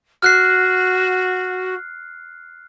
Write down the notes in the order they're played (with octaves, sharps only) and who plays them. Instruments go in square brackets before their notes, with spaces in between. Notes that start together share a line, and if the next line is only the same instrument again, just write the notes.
[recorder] F#4 [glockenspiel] F6 F#6 C7